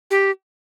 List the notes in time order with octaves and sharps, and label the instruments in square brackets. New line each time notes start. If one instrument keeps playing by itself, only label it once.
[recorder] G4